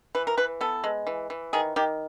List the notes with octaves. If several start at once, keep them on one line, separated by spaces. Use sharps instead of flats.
E3 B4
A#4
E3 B4
B3 A4
G#3
E3
E3
D#3 G#4
D#3 G4